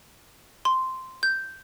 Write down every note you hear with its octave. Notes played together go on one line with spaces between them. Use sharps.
C6
G6